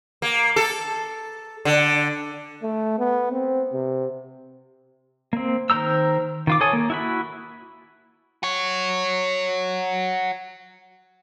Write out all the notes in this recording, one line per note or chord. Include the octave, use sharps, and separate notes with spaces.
A#3
A4
D3
A3
B3
C4
C3
A#3 C4
D#3 A#4 C5 A#5 E6
D#3 F4 D6
A4 C#5 G#5 D#6
A#3
E4 F#4 B5
F#4 C#5